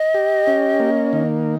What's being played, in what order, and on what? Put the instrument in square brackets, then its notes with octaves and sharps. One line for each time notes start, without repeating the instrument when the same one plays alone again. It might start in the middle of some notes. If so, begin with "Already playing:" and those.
Already playing: [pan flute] D#5
[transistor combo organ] G4
C#4
A#3
D#3